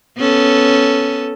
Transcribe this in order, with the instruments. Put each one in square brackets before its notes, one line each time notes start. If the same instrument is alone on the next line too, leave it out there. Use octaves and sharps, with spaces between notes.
[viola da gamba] B3 C#4 A4